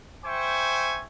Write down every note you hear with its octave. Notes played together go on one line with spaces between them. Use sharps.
C5 E5 G5 G#5 C#6